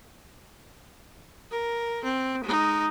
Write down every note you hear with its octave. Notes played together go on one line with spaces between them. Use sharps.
A#4
C4
G#3 D#4